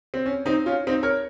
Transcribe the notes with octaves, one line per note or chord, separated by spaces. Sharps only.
C4
C#4
C4 D#4
C#4 F4
C4 D#4
A#4 C#5